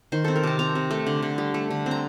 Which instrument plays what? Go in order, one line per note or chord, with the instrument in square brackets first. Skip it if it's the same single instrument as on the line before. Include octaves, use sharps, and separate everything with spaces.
[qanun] D#3 C5
C4 A4
A#4
C3 A5
C4 A#5
C3
A3
D3
D3
G3
A3
D3
C4
A#5